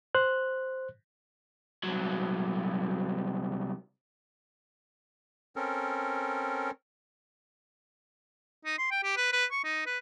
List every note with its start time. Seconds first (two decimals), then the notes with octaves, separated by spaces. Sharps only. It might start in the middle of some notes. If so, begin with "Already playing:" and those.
0.15 C5 F#6
1.83 C2 F#3
5.56 C4 C#4 A4 A#4
8.65 D#4
8.78 C6
8.91 G5
9.04 G4
9.17 B4
9.33 B4
9.52 C#6
9.64 D#4
9.86 B4